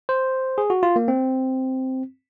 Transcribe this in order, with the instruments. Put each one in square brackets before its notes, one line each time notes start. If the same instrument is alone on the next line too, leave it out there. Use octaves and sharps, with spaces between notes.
[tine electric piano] C5
G#4
F#4
F4
A#3
C4